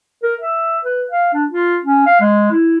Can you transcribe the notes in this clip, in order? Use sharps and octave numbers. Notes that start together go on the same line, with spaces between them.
A#4
E5
B4
F5
D4
F4
C#4
F5
G#3
E4